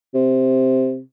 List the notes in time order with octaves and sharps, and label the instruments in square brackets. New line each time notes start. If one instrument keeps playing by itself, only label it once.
[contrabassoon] C3